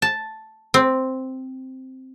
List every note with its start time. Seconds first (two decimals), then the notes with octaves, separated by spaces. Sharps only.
0.02 A5
0.74 C4